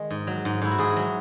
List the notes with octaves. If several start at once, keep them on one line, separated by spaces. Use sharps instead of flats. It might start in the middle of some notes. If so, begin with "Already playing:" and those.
Already playing: D#3 G#3
G#2
F#3
G#2
G#2 E4
F#4
G#2 G#4
F#3